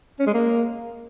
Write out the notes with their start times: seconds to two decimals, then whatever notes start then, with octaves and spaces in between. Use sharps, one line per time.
0.19 C#4
0.27 G#3
0.34 A#3